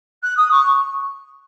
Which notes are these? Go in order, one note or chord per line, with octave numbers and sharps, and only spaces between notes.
F#6
D#6
C#6